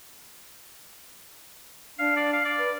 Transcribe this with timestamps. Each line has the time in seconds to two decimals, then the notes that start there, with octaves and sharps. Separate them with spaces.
1.99 D4 F5
2.16 D5
2.33 F5
2.45 D5
2.59 B4